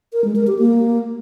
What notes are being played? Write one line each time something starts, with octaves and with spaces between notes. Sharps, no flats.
A#4
G#3
A#4
G4
A#3